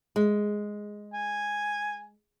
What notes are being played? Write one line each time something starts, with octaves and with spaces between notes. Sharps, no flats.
G#3
G#5